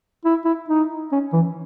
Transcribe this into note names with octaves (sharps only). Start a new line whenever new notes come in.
E4
E4
D#4
C#4
E3